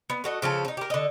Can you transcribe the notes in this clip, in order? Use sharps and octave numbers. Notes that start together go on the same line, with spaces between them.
B3
A3 F#4 D#5
C#3 F3 F4 A4
C#4 D#4
G4 A#4
D3 D#5